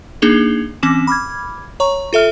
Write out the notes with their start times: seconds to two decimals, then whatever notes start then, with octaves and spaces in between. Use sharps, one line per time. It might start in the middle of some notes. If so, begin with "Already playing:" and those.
0.22 A#3 D4 D#4 G#4 F7 G7
0.83 E3 C4 C#4 D6 E7
1.07 B5 D6 F6 G#6
1.80 C#5 A#5 C#6
2.13 F4 A4 E5 F6